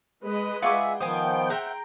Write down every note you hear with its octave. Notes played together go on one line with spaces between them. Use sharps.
G#3 B4 D#5
F4 G#4 E5 F#5 G#5 C#6 D6
D#3 F3 B3 C5 F5 G5 G#5 D#6
G#4 C5 E5 F#5 A#5